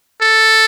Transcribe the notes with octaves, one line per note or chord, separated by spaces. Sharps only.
A4